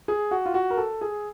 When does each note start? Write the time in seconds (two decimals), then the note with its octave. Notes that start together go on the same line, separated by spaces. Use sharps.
0.08 G#4
0.31 F#4
0.46 F4
0.54 F#4
0.70 A#4
0.78 A4
1.01 G#4